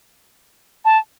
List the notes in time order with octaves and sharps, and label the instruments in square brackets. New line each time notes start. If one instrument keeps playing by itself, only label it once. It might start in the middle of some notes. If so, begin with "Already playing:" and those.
[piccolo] A5